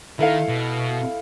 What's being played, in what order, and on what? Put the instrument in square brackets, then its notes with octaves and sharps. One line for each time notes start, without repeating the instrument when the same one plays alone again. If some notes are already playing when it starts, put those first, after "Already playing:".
[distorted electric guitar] D#3 [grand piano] E4 A4 F5
[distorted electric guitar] B2